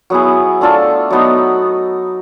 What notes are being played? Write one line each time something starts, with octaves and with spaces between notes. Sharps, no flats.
F#3 B3 E4 G#4
A3 D4 F4 A4
F#3 B3 D#4